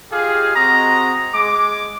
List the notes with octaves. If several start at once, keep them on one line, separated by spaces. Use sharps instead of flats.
F4 G4 G#4 D#5 F5
G#3 C4 F#4 D#5 A#5
G#3 D6